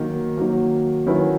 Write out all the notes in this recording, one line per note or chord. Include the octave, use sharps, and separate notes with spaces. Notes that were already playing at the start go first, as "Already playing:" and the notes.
Already playing: D#3 F#3 A#3
D#3 F#3 A#3
D#3 F#3 C#4 E4 B4